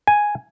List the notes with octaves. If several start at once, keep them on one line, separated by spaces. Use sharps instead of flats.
G#5